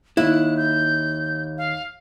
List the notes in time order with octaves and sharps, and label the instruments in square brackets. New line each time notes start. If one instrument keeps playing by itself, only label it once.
[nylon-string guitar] D#2 [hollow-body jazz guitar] E4 [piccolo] F#6
[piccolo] G6
F5